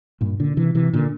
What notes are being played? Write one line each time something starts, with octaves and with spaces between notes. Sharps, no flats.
G2 A#2
A#2 D3
C3 E3
C3 E3
A#2 D3